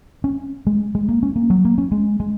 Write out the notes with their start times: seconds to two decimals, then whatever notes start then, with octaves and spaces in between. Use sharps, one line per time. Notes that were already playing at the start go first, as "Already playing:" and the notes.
0.24 C#4
0.67 G#3
0.95 G#3
1.09 A#3
1.23 C#4
1.36 A#3
1.50 F#3
1.65 A#3
1.78 C#4
1.92 G#3
2.20 G#3